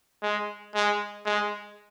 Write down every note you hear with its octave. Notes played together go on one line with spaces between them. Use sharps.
G#3
G#3
G#3